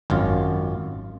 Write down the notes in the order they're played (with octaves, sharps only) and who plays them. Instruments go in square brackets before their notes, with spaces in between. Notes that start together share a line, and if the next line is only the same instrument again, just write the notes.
[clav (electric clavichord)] G#1 F#2 F4